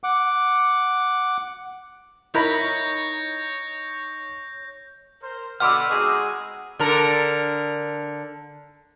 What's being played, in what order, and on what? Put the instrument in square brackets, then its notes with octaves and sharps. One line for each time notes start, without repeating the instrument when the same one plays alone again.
[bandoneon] F#5 D6
[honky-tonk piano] D#4 A#5 [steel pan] E4 A#4 B5 [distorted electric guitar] C#5 [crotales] G6 A#6
[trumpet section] A#4 C5
[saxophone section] B2 D3 [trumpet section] B4 [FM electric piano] F#5 D6 E6 [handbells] C6 F6
[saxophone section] G#3 G#4 [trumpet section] C4 D#4 F#4
[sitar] D3 A#4